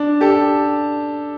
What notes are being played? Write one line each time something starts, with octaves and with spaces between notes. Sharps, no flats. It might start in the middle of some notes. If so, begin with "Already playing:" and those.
Already playing: D4
G4 A4